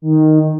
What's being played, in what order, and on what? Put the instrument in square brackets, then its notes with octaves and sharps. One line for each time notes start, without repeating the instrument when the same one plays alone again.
[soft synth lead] D#3